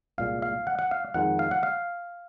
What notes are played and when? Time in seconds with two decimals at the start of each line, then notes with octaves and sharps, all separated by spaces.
0.18 C2 A#2 G#3 F5
0.42 F5
0.67 F#5
0.79 F#5
0.91 F5
1.14 F2 D#3 G#3 F#5
1.39 F5
1.51 F#5
1.63 F5